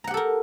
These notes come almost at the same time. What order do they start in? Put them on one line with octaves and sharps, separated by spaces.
A#5 F#5 G4 A4 A#4